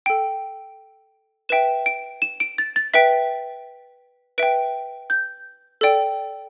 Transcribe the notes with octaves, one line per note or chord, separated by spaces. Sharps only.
A4 G5
B4 E5 G5 E7
D7
E7
D7
A6
A6
B4 E5 G5 B6
B4 E5 G5 D7
G6
A4 D5 G5